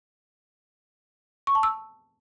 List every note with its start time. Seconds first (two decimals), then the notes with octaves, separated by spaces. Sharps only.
1.47 C#6
1.55 A5
1.63 E6